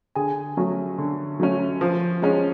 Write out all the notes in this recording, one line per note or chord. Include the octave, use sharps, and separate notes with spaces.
D3 G#4 G#5
F#3 A3 C#4
D3
F#3 A3 C#4
F3
G#3 C#4